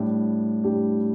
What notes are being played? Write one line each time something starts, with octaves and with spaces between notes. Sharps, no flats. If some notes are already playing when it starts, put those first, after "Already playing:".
Already playing: A2 G3 D4 G4
A2 G3 D4 G4